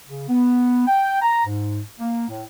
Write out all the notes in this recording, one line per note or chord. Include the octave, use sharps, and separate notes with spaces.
C#3
B3
G5
A#5
G#2
A#3
A2